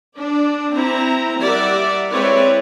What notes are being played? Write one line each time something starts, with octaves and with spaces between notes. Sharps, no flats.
D4 D5
C4 E4 A#5
G3 A#4 D5 E5 F#5
G#3 C4 E4 B4 C#5 D5